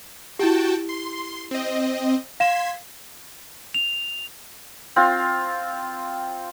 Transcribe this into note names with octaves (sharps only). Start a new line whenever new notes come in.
E4 F#4 G4 G5 A5
C6
C4 D#5
F5 C6 G#6 B6 E7
F7
C4 F4